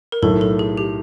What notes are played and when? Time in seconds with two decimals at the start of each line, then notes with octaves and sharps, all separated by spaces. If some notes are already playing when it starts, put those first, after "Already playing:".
0.12 A#4
0.22 B1 A2 F#3 A3 A4
0.41 A4
0.59 G#4
0.77 G4